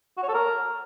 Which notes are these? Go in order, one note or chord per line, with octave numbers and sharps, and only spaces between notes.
F#4
C#5
A4
A#4